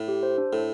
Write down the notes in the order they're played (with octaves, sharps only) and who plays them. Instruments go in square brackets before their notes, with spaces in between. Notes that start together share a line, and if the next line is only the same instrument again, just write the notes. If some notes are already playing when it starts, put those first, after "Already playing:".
Already playing: [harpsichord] A2
[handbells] G4
C5
D4
[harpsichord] A2 [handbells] A4